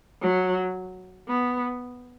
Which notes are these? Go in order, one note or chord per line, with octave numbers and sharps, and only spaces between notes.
F#3
B3